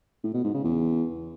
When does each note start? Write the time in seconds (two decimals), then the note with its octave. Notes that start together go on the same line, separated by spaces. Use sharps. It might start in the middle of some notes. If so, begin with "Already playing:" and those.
0.23 A2
0.34 B2
0.44 G#2
0.54 C#3
0.64 E2